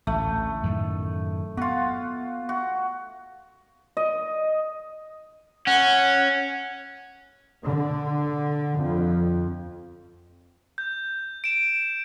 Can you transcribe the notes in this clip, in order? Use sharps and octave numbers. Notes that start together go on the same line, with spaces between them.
A1 D2 A3
F#2 A2 D#3
B3 F4 F#4
F#4
D#5
C#4 F#5
D3
F2
G6
D7 E7